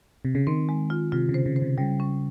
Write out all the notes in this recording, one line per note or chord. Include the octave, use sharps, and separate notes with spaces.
C3
C#3
D#3 C4
G#3
F4
C3 F4
C#3
C5
C#3
C5
C3
C#3 G3
C#4